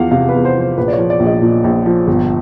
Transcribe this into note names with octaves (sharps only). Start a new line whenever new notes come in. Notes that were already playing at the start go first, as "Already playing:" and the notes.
Already playing: E2 F3 F5 F#5
C3 F5
E2 B4
C5
F3
C5
A#1 B4
D5
C#5
F3
D5
A#1
D#5
A#2
A#1
F3
G1